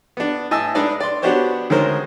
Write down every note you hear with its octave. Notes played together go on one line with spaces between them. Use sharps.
B3 D4
A2 D#5 G#5 A5 E6
G#3 D4 D#4 B4 D5
D5 C6
B3 D4 F#4 G4 C5 C#5
D2 D#3 G#3 C#4 A#4 C5